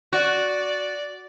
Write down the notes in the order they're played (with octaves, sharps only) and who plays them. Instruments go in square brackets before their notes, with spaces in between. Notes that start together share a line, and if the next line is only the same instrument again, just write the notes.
[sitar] F#4 [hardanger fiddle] D5